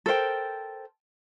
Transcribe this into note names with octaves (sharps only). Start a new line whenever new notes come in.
A4 A#4 C5 G5